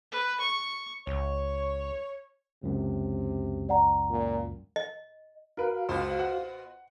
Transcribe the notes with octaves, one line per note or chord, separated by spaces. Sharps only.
B4
C#6
C#2 C#5
C#2 F#2 C3
D5 F#5 A#5
A#2
D#5
F#4 A#4 B4 F5
C#2 B2 F4 C5
F#5